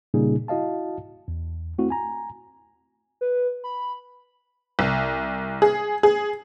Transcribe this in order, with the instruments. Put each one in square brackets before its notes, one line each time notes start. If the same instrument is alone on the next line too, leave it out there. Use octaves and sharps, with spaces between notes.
[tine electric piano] A#2 C#3 G3 A#3 D#4 G#4
E4 F#4 D#5 F5 A5
E2
A3 C4 E4 F#4
G#5 A#5
[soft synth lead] B4
B5
[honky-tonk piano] C2
G#4
G#4